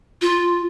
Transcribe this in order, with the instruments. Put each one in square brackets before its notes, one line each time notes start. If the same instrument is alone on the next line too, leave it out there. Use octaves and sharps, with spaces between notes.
[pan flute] F4